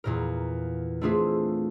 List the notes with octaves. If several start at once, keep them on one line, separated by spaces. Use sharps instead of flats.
E2 A#2 A#4
A3 C4 D4 F4 G#4 E5